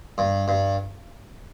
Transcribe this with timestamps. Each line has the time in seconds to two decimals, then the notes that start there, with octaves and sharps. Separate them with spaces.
0.18 G2
0.48 G2